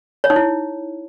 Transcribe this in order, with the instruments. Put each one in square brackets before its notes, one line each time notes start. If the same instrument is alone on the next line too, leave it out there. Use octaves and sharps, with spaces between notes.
[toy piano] C#5
D#4
E4